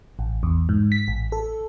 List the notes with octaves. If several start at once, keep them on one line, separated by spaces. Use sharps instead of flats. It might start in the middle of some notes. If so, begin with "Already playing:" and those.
A1
E2
G#2
B6
A1
A4